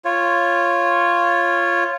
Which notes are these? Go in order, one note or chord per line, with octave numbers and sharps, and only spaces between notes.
F4 C#5